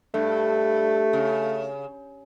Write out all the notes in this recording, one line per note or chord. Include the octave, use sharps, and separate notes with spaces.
G2 A3
C#3